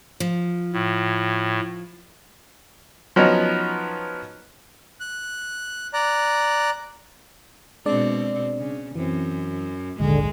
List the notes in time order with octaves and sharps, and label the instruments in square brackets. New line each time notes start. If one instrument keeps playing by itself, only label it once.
[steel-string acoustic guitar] F3
[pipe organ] A2
[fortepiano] F3 F#3 B3 C#4 D#4
[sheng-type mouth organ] F#6
D5 A#5 F#6
[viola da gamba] B2 C4 [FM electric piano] G#3 D4 D5
[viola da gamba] C#3
[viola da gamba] F#2 [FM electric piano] E3 C4
[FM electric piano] A#1 D#2 G#2 [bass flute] D3 [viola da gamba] G#3